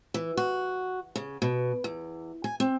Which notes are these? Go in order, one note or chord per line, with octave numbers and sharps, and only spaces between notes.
E3
F#4
C#3
B2
E2
G#5
C4